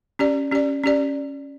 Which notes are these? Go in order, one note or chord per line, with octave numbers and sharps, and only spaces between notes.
C#4 G4 D5
C#4 G4 D5
C#4 G4 D5